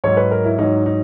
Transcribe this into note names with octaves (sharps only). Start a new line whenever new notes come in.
G#2 F#3 C#5
B4
A#4
E4
G#2 F#3 D#4
D#4